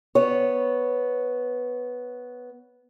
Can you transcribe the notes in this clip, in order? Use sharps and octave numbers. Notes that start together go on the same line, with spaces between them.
B3 C#5